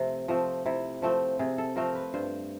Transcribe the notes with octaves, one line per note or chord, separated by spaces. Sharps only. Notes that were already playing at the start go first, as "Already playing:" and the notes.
Already playing: C3 F3 A3 C4
F3 A3 C4
C3 E4
F3 A3 C4
C3 G#4
A4
F3 A3 C4 A#4
B4
G2 C5